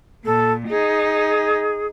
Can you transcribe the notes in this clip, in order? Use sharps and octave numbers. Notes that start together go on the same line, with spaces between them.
A#2 A4
D#4 G#4